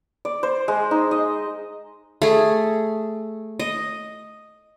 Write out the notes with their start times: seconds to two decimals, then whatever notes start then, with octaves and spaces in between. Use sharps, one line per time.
0.25 D5
0.43 C5
0.68 G#3
0.91 D#4
1.11 D#5
2.22 A3 G#4
3.59 D#5